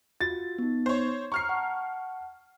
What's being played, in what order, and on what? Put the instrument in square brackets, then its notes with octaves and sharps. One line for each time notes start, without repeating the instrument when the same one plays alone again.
[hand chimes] F4 F#4 [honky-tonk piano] A6
[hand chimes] B3 D#4
[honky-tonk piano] C5 C#5
[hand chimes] A#5 [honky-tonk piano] C#6 F6 C7
[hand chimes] F#5 A5